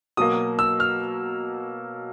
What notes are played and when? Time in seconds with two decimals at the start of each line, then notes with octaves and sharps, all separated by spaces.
0.17 B2 F#3 A#3 D#6
0.59 E6
0.80 F6